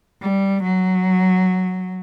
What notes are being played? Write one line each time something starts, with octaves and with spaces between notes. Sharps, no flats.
G3
F#3